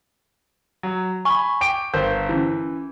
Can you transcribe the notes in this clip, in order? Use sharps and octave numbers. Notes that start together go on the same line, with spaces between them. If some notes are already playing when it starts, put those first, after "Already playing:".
F#3
G#5 B5 C#6
G5 D6 D7
G1 A#4 C5 G6
E3 C#4 E4